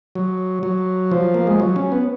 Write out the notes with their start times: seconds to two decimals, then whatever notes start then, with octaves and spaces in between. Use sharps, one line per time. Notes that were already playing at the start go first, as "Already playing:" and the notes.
0.15 F#3
0.63 F#3
1.11 F3
1.34 A#3
1.47 G#3
1.60 F#3
1.76 C#4
1.92 B3